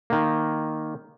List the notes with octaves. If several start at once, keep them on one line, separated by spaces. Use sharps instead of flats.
D#3 A#3